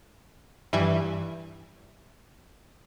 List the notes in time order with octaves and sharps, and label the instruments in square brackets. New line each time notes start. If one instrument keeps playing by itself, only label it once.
[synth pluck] G2 E3 E5 G#5